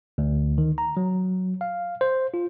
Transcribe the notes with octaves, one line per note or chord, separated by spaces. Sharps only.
D2
D#3
A#5
F#3
F5
C5
F4